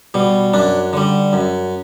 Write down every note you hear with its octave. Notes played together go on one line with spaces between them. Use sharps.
B2 G3
F#2 D4
D3 G3
F#2